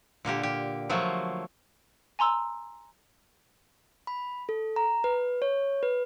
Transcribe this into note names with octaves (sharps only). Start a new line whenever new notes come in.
A#2 D3 A#3 G4
G4
F3 F#3 A3 A#3 F4
G#5 A#5 C6 E6
B5
A4
A#5
B4
C#5
B4